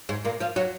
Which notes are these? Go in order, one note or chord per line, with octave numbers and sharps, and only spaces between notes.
G#2 G#3
A#2 A#3
F3 F4
F#3 F#4